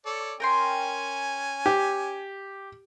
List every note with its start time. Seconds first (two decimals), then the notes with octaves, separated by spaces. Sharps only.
0.06 A4 C#5 D5
0.40 C#4 A#4 G5 G#5 C6
1.66 G4